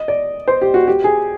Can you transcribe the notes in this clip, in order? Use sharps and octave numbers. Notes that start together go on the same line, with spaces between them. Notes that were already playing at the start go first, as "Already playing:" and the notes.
Already playing: D#5
D5
C5
G4
F#4
G4
G#4